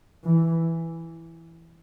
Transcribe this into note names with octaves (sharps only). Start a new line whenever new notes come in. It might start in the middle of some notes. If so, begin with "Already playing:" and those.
E3